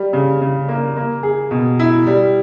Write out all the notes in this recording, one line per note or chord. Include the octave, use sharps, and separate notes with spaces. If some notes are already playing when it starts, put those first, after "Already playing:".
Already playing: G3
C#3
C#3
A#3
A#3
G#4
B2
E4
G3